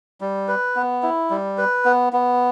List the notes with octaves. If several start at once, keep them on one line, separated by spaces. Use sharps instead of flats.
G3
B4
B3
E4
G3
B4
B3
B3